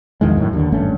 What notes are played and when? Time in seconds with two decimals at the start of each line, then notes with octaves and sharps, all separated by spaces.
0.21 A#1 E2 D#3 G#3
0.37 F#2 A2 D#3
0.53 D#2 D3
0.72 G#1 G2 A3 C#4